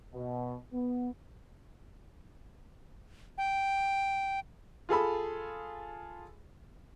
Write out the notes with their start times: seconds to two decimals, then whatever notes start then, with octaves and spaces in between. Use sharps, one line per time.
0.14 B2
0.74 B3
3.38 G5
4.89 F4 G#4 A4 B5